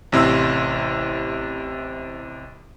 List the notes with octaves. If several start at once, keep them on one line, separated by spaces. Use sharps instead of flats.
A1 C3 E4 C6 E6